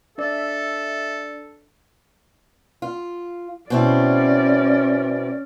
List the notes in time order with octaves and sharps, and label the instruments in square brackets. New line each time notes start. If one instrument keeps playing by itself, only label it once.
[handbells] D4 D5 [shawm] A4 [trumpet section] E5
[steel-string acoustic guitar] F4
[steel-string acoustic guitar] B2 C4 E4 [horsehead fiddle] C#4 D5